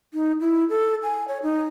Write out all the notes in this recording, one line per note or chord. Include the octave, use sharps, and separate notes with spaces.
D#4
E4
A4
G#5
C#5
D#4